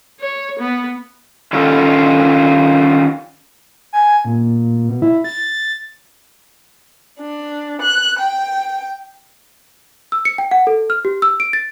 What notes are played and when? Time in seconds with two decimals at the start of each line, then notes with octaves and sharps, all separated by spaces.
0.20 C#5
0.59 B3
1.53 D#3 C#4 D4 F4 F#4 A4
3.93 G#5
4.25 A#2
4.89 B2
5.02 E4
5.24 A6
7.18 D4
7.80 F#6
8.18 G5
10.12 E6
10.25 C#7
10.38 G5
10.51 F#5
10.67 A4
10.90 F6
11.05 G4
11.22 E6
11.40 D7
11.53 A6